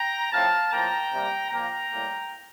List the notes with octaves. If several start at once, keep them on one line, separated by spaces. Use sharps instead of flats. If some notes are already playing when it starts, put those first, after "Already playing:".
Already playing: G5 A#5
A2 F3 C4 F5 A5
A2 F3 A#3 G5 A#5
C3 G3 A#3
A#2 F3 A#3 G5 A#5
A2 G3 A#3